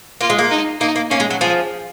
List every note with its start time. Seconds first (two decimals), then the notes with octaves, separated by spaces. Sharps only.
0.21 A#3 F4
0.30 G#3
0.39 A#3
0.50 D#4
0.80 A#3 D#4
0.96 A#3
1.10 A#3 C#4
1.20 G#3
1.30 F#3
1.41 F3 G#4